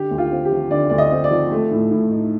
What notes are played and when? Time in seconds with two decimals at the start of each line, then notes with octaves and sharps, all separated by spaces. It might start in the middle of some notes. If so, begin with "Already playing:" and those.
Already playing: D3 G4
0.11 D2
0.18 F4
0.32 C4
0.45 G4
0.51 F3
0.71 D3 D5
0.90 D2 D5
0.98 D#5
1.12 C4
1.24 D5
1.31 F3
1.51 A3
1.71 A2
1.91 A2
2.11 D#4